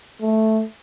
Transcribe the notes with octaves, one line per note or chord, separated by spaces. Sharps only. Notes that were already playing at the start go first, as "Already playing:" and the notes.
A3